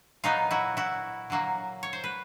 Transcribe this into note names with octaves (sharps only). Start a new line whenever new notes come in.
A#2 F#3 B3 D#4 F4
E4 F#4
E4 F#4
D3 F#3 A#3
C#5
C5
B4